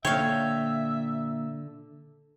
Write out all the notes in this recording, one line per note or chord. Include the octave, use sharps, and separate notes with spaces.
A#2 D3 C#5 E5 F5 G5